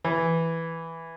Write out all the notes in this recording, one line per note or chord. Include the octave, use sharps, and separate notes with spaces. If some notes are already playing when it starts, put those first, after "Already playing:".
E3